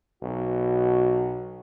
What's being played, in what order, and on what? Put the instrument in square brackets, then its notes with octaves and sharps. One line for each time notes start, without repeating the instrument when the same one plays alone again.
[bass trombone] B1 [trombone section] B2 F#4